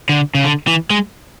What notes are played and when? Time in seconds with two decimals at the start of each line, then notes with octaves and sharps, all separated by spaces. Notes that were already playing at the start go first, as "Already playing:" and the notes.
0.09 D3
0.35 C#3
0.44 D3
0.67 E3
0.90 G#3